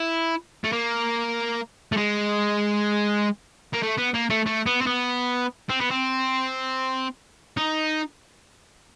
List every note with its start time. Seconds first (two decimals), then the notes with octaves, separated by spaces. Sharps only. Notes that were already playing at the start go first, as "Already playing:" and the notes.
Already playing: E4
0.64 A3
0.72 A#3
1.92 A3
1.97 G#3
3.74 A#3
3.83 A3
3.98 B3
4.14 A#3
4.30 A3
4.46 A3
4.66 B3
4.81 C4
4.87 B3
5.70 C4
5.81 B3
5.91 C4
7.57 D#4